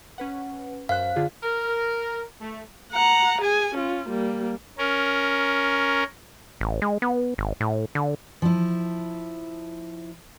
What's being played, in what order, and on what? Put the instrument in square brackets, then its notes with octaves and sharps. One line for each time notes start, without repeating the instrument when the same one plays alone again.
[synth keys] C#4 B4 F#5
[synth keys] F#2 C5 F#6 [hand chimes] F5
[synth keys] D3 F4 G#4
[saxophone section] A#4
A3
[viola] F#5 A#5
G#4 G#5
C#4 F4
G3 A#3
[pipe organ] C#4 A#4
[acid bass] A1
G#3
B3
G#1
A2
D3
[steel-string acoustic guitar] F3 E4